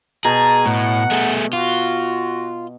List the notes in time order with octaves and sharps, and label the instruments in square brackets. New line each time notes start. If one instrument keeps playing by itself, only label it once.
[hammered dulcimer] B2 A#5 [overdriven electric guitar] G#4 [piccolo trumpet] A5
[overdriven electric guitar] A2 [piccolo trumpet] F#5
[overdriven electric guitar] A3 G#4
[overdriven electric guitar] F4 [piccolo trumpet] F#4